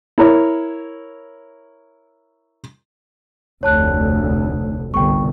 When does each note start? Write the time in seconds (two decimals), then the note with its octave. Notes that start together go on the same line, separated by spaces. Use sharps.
0.18 E4 A#4 C#5
3.63 F1 D2 C#5 A5 F#6
4.94 G1 C2 G5 C#6